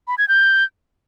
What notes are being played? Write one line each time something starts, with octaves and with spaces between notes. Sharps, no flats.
B5
G#6
G6